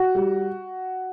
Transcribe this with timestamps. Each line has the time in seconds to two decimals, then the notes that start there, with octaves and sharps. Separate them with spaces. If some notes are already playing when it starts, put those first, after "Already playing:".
Already playing: F#4
0.15 G3